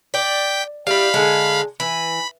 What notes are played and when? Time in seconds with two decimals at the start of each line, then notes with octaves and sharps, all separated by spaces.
0.14 D5 G5 B6
0.87 G3 E4 F5 B5
1.14 D3 G#3
1.80 E3 B5